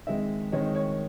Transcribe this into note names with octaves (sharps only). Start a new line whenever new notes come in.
D#3 G#3 C4 D#4 E5
D#3 G#3 C4 D#4 C#5
C#5